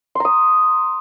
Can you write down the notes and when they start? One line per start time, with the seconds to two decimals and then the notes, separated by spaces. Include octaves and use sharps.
0.15 C6
0.20 A#5
0.25 D#6